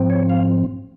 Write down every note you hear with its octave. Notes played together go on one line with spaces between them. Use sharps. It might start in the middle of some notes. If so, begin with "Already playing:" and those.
Already playing: G#2 F3 C4
C#5
F5